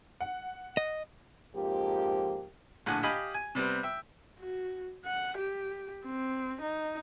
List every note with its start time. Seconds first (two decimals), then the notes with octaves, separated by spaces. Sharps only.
0.21 F#5
0.77 D#5
1.54 F2 G#2 F3 A#3 G4
2.86 A#1 A2 D3 F#5 G#5
3.03 G4 D#5 F5 G#5 B5
3.34 G#5
3.55 C3 G3 B3 C4
3.83 E5 G5
4.40 F#4
5.06 F#5
5.38 G4
6.05 C4
6.61 D#4